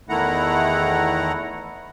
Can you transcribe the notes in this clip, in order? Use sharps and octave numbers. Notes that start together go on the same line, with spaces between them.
E2 D#3 A3 E4 F#5 A#5